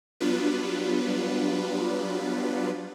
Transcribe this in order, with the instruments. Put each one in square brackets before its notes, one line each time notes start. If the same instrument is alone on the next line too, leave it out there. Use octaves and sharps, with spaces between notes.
[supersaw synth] F#3 G3 B3 D4 F4 B4